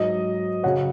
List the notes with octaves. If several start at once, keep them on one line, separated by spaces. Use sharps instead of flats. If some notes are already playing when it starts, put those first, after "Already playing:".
Already playing: G#2 F#3 D#5
F#2 C#3 F#3 C#5 F#5